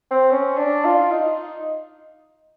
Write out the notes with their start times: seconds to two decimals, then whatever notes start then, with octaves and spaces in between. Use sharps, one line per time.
0.11 C4
0.31 C#4
0.58 D4
0.85 F4
1.11 D#4